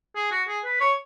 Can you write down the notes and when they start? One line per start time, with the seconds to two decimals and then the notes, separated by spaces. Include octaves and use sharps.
0.15 G#4
0.31 F#4
0.48 G#4
0.64 B4
0.80 C#5